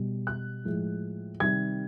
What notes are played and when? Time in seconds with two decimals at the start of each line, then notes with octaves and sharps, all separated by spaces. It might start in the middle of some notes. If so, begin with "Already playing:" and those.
Already playing: B2 G3
0.27 F#6
0.65 A2 F3 G#3
1.40 C3 D#3 G3 G#6